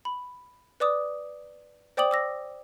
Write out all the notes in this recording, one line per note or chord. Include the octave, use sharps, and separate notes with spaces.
B5
B4 D5 D6 D#6
C5 D5 G5 D6 D#6 F#7
D6 E6 A#6